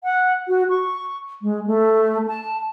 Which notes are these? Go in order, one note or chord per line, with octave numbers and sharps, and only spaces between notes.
F#5
F#4
C#6
G#3
A3
A5